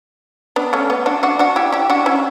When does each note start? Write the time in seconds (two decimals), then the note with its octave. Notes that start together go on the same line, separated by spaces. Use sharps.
0.56 B3 D4
0.73 A3 C#4
0.90 B3
1.06 D4 F#4
1.23 D4 F#4
1.39 D4 F#4
1.56 E4 G4
1.72 E4 G4
1.90 D4 F#4
2.06 C#4 E4